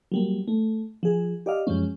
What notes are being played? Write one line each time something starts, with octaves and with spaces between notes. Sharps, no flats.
F#3 G3 A#3
A3
F3 G#4
G4 D5 D#5 F5
F#2 F3 G#3 C#4